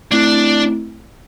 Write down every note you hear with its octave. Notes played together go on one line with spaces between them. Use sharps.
A3 C4 D4 E4